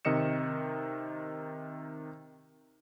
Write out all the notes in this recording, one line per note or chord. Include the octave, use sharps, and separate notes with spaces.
C3 D#3 D#5 C#7 E7